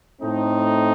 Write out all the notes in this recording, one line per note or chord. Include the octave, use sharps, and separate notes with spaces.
A2 A3 C4 D#4